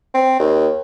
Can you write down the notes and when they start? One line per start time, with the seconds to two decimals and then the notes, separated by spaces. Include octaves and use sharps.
0.14 C4
0.40 D#2